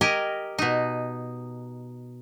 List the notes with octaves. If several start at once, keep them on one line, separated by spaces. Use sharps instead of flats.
G4 A#4 D#5 G#5
B2 D#4